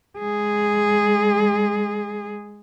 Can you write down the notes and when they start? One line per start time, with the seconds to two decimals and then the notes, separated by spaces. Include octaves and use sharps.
0.19 G#3 G#4